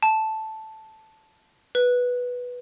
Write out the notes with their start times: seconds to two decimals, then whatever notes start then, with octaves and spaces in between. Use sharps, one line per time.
0.03 A5
1.75 B4